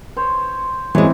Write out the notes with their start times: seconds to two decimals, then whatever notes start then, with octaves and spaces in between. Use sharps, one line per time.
0.17 C5 C#5
0.95 F#2 E3 G#3 C4